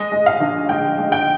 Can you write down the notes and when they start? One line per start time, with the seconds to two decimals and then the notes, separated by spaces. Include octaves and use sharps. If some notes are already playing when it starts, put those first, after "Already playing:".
Already playing: G#3 D#5
0.12 G#3
0.26 F5
0.40 A#1
0.69 G#3 G5
0.98 G#3
1.12 G5